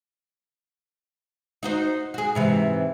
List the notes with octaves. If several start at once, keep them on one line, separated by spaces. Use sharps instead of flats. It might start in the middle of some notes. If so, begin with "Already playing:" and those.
D#4 F#4 C5
F#4 G#4
G#2 C3 E3